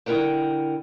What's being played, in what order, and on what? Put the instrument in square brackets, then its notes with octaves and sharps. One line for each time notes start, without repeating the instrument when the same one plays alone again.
[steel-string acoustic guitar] D3 E4 A#4 F#5 G5